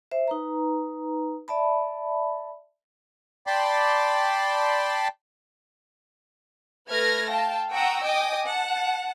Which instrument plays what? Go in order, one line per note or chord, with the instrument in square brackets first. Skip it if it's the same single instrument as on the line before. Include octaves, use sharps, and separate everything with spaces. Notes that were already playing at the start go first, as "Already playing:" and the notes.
[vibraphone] C5 E5
D#4 B4 A#5
D5 E5 A5 B5
[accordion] D5 G5 A5 B5 C6 D6
[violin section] A3 B4 F6 G#6 A#6
F5 G5 A5
F#5 G5 A#5 C#6 D#6 E6
D#5 G5 G#5 D6 D#6
F#5 A5